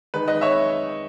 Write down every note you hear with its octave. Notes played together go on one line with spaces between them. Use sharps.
D#3 G#3 D#4 B4
B4 D#5
C#5 E5